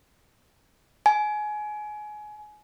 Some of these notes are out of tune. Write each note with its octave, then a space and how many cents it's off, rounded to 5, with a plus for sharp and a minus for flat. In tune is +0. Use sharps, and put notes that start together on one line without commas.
G#5 +25